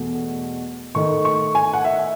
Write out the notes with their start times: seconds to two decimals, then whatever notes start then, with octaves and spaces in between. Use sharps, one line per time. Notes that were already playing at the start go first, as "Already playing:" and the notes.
Already playing: E2 B2 A3
0.95 D#3 A3 D#4 C#6
1.25 C#6
1.55 G#5
1.74 F#5
1.85 E5